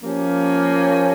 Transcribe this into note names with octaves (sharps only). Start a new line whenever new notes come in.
F3 A#3 C#4 G4